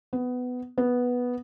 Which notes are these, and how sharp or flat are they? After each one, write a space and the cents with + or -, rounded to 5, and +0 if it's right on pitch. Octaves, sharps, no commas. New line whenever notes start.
B3 +15
B3 -5